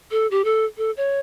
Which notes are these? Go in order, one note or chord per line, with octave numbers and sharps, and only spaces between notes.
A4
G4
A4
A4
C#5